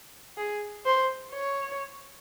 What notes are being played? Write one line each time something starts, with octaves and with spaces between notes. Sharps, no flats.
G#4
C5
C#5